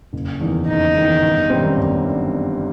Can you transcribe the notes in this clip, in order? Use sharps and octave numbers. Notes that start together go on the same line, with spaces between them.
F#1
E2 D#3
F#1 D#4
E2 D#3
G1
F#2 D#3 G3 C4
G1